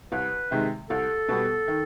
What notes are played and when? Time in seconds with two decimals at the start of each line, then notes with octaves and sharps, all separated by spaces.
0.12 C2 B4
0.51 C3 D#3 G#3
0.90 C2 A4
1.28 B2 G3 B3
1.68 D#3